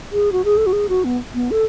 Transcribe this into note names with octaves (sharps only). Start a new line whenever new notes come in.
G#4
F#4
G#4
A4
F#4
G#4
F#4
B3
B3
A4